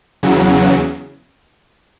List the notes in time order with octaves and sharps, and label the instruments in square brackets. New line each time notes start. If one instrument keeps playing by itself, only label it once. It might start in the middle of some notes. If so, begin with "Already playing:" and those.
[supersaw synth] E2 C#3 F#3